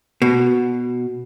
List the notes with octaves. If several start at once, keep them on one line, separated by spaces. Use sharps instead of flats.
B2